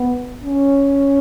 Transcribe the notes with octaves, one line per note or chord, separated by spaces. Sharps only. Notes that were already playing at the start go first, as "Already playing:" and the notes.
Already playing: B3
C#4